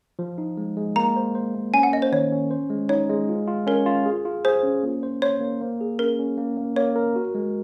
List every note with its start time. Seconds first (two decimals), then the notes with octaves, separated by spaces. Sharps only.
0.19 F3
0.38 D#4
0.57 G#3
0.77 G#3
0.96 A#3 A#5
1.16 C5
1.35 C5
1.55 A#3
1.74 C#4 G#5
1.83 F#5
1.93 A#3 D#5
2.02 C5
2.12 D#3 C#5
2.32 C#4
2.51 C5
2.70 G#3
2.89 D#4 C#5
3.09 G#3
3.29 F4
3.48 F4
3.67 C#4 A#4
3.86 F4
4.06 G#4
4.25 F4
4.45 G#4 C5
4.63 C#4
4.83 A#3
5.03 C5
5.22 C5 C#5
5.41 A#3
5.61 A#3
5.81 G#4
5.99 C#4 A#4
6.19 C#4
6.38 A#3
6.57 A#3
6.76 A#3 C#5
6.96 A#4
7.16 F#4
7.35 G#3